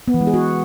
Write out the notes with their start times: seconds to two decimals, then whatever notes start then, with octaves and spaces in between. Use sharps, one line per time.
0.08 B3
0.14 E3
0.21 G#3
0.27 G#4
0.34 F#4